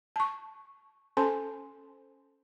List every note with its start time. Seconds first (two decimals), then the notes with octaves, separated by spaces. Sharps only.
0.16 A5 C#6
1.17 C#4 A4 C5 G#5 A5 C6